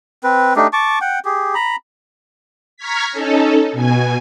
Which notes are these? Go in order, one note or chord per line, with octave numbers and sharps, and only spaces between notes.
C4 B4
A3 D4 D#4 G4
A5 C#6 D6
F#5 G5
G4 G#4
A#5 B5
A#5 C#6 F6 G#6 B6
C#4 D#4 A4
B2 G#5